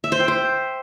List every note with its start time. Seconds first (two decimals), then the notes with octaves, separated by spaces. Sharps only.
0.04 E5
0.12 C5
0.20 G5
0.28 C5